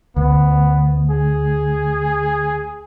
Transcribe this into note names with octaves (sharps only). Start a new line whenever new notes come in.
D2 B3
G#4